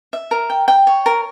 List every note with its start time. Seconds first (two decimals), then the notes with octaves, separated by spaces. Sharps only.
0.13 E5
0.31 A#4
0.50 G5
0.68 G5
0.87 C#5
1.06 A#4